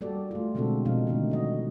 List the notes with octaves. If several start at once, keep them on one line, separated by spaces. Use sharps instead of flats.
G3 A#3 F#4 G4 A4 D5
A3 F4
B2 D3 G#3 C4 F#4 A4
B2 F3 C4 D#4 F5
D3 D#3 A3 D#4
G3 F#4 D#5